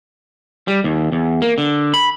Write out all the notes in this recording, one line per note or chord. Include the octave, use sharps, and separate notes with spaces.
G3
D#2
E2
A#3
D3
B5